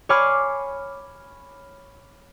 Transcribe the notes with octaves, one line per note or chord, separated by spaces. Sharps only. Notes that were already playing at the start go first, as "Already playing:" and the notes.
C#5 G#5 B5 D6 F6 C7